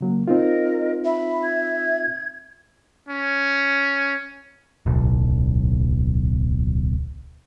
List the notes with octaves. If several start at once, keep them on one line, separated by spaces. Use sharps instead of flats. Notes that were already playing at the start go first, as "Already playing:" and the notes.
C#3 F#3 A#3
C4 D#4 F4 A#4 D#5
E5 B5
G#6
C#4
D1 B1